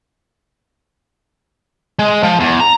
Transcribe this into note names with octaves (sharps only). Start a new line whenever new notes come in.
G#3
F3
E2
A#5